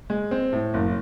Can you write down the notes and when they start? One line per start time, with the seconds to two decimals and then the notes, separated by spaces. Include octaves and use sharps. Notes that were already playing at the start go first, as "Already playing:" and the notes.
0.10 G#3
0.31 C4
0.53 A2
0.74 F#1